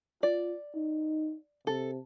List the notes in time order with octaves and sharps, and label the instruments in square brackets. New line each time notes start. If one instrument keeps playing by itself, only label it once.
[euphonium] F4 [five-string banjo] D5
[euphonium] D#4
[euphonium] C3 [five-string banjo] A4